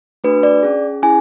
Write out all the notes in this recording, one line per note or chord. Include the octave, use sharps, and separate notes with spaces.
A3 D4 F#4 B4
D5
C#4 G#4
C#4 E4 G#4 G#5